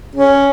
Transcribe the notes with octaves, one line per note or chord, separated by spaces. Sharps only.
C#4